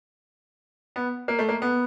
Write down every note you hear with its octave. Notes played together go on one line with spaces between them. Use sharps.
B3
A#3
A3
A#3
B3